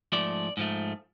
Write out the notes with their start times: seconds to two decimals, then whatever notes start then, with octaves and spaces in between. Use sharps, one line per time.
0.12 G#2 F3 A3 D5
0.57 G#2 F3 A3